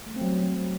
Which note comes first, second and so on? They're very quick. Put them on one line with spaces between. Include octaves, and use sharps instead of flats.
A3 G3 C4 F#3